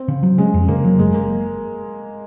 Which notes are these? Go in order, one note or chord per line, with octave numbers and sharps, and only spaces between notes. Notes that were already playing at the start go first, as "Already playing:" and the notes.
Already playing: C4
C#3
F#3
G#3 C#4
F2
C#3 A#3
F#3
F#1 G#3
A#3